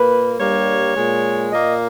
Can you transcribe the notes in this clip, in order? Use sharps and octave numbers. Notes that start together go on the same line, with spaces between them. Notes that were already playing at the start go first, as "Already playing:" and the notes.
Already playing: A#2 A#3 B4
G2 G3 A#3 C#5
A#2 G#3
A#2 A#3 D#5